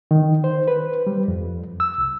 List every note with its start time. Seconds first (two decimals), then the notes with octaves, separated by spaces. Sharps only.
0.11 D#3
0.44 C5
0.68 B4
1.07 G3
1.28 F2
1.80 E6
1.98 C2